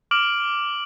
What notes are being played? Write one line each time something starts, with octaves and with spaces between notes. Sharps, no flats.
D6 F6 D7 F#7